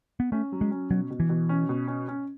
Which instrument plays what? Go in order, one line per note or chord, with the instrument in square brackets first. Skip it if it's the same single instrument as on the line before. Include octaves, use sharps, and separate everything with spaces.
[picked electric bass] B3
[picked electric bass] A3 [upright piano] C#4
[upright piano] F#3
[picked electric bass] G#3
[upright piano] C#4
[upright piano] B2 [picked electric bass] F#3
[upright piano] B2
[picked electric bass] E3
[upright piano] B2
C#4
B2
C#4
C#4